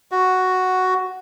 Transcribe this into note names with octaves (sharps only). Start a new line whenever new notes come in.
F#4